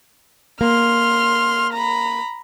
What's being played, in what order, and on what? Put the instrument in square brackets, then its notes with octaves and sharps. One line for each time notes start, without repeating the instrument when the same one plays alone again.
[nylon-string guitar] A#3 [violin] C6 F6
[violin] A#5 B5